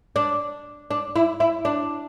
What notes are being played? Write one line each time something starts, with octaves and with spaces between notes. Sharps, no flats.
D4
D4
E4
E4
D4